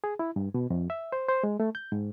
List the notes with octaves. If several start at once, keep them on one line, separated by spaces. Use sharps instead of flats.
G#4
E4
G2
B2
F2
E5
C5
C5
G#3
A3
G6
G#2